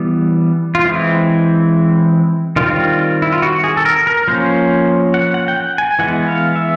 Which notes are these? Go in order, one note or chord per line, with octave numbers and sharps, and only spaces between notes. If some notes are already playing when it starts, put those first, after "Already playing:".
Already playing: E3 G3 B3
F4
E3 G#3 C4 E4
D#3 G3 C4 F4
E4
F4
F#4
G#4
A4
A#4
A#4
F3 A#3 C#4 C5
F#5
F#5
G5
F#5
G#5
E3 G#3 B3 F#5
F5
E5